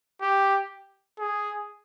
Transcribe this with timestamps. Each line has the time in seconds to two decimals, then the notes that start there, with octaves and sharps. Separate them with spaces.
0.21 G4
1.19 G#4